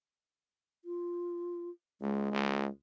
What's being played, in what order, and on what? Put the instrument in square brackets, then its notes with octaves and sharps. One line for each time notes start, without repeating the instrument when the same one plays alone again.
[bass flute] F4
[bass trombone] C#2 [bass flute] G#3
[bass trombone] C#2